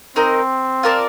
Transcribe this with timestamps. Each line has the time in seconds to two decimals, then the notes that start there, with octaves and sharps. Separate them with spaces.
0.16 C4 D#4 A#4 D#5
0.83 F4 A#4 D5 A5